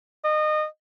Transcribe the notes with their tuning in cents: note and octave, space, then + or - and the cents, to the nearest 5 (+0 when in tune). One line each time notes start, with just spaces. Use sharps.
D#5 -25